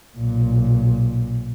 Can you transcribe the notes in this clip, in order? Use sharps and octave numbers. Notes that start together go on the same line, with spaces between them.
B1 A#2